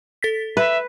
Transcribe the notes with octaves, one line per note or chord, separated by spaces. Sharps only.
A4 A6 B6
B4 E5